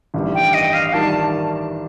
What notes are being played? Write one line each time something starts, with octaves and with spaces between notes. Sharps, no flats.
A1 G2 D#3 G3
G5
D#5
F5
D#3 G3 A5